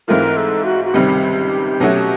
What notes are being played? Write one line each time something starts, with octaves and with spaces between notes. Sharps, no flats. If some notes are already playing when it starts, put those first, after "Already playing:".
G#2 E3 A3 C4 F4 A#4
A4
F#4
F#4
C#2 C3 D#3 G3 C4 G4
B2 F#3 A3 C#4 F#4